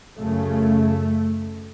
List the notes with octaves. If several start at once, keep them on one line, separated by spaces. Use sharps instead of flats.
F#2 C#3 A3